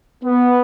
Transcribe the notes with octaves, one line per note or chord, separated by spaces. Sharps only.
B3